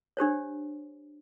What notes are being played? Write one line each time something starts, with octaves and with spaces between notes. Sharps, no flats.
D4 G4 C5 C#5